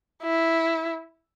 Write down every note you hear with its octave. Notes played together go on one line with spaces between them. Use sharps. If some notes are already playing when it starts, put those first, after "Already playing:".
E4